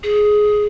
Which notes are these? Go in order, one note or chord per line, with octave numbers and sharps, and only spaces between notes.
G#4